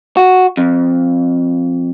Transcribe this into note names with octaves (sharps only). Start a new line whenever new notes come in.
F#4
F2